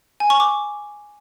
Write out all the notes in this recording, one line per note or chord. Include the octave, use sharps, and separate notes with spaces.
G#5
C#6
D6